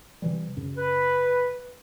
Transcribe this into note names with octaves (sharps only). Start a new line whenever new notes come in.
C3 E3 G3
F#2 C#3
B4